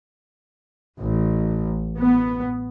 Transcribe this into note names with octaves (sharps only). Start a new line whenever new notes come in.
A1
B3